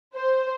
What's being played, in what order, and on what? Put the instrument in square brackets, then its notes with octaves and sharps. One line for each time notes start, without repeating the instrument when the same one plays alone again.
[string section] C5